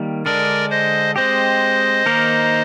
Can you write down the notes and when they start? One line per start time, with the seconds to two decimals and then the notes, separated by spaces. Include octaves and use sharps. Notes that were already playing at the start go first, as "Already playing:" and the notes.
Already playing: D#3 G3 A#3
0.25 D3 G#3 D4 A#4 D5
0.70 C5 D#5
1.16 G#3 C4 G4 C5 D#5
2.06 D#3 A#3 D#4 A#4